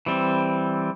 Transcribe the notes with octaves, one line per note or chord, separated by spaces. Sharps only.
E3 G3 C4